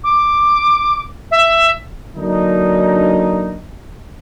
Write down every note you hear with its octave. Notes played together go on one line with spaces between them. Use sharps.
D6
E5
D3 F#3 A#3 D4 D#4